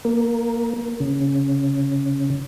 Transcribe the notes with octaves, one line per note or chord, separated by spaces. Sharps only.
A#3
C#3